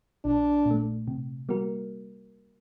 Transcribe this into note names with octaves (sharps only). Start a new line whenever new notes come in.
A#1 D4
A#2 A3
C3
G3 A#3 F#4 A#4